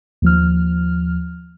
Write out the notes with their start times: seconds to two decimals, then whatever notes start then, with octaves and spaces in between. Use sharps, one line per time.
0.22 D#2 F3 F6